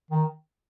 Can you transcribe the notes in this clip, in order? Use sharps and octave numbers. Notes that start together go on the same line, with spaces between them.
D#3